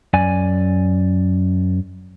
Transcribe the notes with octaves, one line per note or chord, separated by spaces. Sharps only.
F#2 D5 G#5